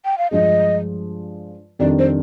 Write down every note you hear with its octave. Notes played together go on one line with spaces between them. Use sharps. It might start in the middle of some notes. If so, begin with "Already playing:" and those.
G5
F5
G2 F3 G#3 D#5
F2 D#3 G3 D4 D5
C5